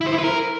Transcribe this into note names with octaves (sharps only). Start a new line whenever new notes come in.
E4
C5
E4
B4
A#4